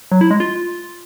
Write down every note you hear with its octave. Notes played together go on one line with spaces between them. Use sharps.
F#3
E4
G#3
F4